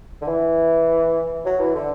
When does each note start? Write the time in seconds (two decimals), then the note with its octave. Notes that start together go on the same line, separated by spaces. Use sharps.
0.22 D3
0.27 E3
1.45 F#3
1.59 E3
1.74 D3